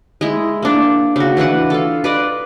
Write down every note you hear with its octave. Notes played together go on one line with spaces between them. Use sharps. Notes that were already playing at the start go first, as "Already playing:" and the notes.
G#3 E4
A#3 D4
C#3 F#4
E3 D4 B4 F#5
F4 A4
B4 D5 D#5